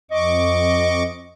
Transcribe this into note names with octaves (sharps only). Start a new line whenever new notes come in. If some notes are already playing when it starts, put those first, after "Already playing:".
F2 D#5 C#6 D6